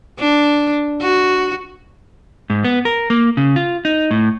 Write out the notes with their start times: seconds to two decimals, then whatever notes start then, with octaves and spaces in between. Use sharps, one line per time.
0.19 D4
1.01 F#4
2.50 G#2
2.64 B3
2.85 A#4
3.10 A#3
3.37 C#3
3.56 F4
3.85 D#4
4.11 A2